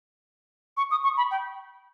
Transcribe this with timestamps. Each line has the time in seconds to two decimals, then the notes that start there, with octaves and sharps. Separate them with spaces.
0.77 C#6
0.91 D#6
1.04 C#6
1.17 B5
1.31 G5